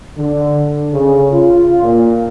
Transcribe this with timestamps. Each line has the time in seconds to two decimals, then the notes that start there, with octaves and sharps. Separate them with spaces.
0.16 D3
0.91 C#3
1.31 F4
1.83 A#2